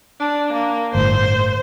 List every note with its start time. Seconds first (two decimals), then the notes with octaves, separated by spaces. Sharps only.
0.20 D4
0.53 A#3
0.95 G1 A2 C5